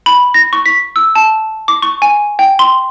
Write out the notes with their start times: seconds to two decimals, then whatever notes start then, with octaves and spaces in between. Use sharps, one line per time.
0.06 B5
0.34 A#6
0.53 C#6
0.66 B6
0.96 E6
1.15 A5
1.68 D6
1.82 C#6
2.02 G#5
2.39 G5
2.59 C6